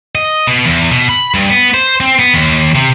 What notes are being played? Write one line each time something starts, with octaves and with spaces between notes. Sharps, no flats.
D#5
B2
E2
B2
B5
G2
B3
C5
C4
B3
D#2
C3